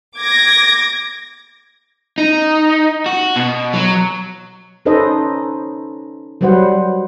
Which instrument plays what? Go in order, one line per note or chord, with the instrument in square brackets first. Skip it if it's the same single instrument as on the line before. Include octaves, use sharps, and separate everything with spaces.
[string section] D6 G#6 A#6
[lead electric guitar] D#4
F#4
B2
F#3
[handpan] C#4 D#4 A4 B4 C5 D#5
F#3 G3 B4 C5 F#5